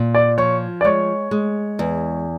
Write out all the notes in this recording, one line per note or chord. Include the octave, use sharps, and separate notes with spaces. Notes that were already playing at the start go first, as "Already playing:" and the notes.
Already playing: A#2
D5
F3 C#5
D5
G#3 C#5
G#3
E2